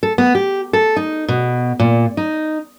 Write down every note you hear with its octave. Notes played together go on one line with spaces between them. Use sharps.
A4
B3
G4
A4
D#4
B2
A#2
D#4